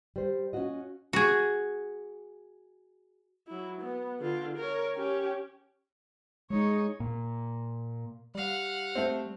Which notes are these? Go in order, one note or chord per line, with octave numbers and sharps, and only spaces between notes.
G3 C5
C#4 D4 F4 F#4 D#5
F#4 G#4
F#3 E4
B3
D3 F4
A#4 C#5
C#4 G4
G#3 D#4 C#5
A#2
G3 F5 F#5
A3 C4